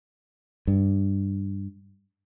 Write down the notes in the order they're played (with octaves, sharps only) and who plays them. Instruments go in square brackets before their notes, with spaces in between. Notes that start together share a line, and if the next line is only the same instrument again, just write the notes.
[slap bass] G2